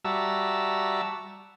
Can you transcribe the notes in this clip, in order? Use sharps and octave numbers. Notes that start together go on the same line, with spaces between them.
G3 F#4 E5 A5 A#5 E6